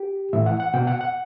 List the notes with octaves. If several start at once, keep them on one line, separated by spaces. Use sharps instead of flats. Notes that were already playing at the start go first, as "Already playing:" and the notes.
Already playing: G4
A2 E3 E5
F#5
F#5
B2 G5
F#5
F#5